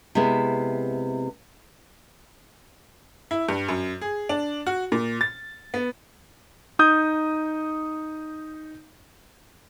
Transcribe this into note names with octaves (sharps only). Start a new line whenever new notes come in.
C3 G#3 B3 E4
E4
G2
F#2
G#4
D4
F#4
A#2
A6
B3
D#4 D#6 G6